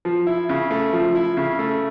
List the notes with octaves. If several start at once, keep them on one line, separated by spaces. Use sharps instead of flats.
F3
E4
C#3
A3
F3
E4
C#3
A3